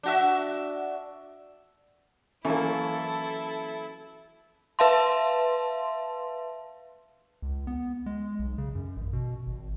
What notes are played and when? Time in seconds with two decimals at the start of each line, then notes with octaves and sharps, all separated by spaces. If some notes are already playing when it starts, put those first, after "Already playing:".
0.03 D4 F#4 E5
2.45 E3 F#3 A#3 C#4 E4 A4
4.79 B4 E5 F5 A5 C6
7.42 C#2
7.67 B3
8.06 G#3
8.39 B1
8.58 C#3
8.75 F#2
8.97 A1
9.13 B2
9.47 G#1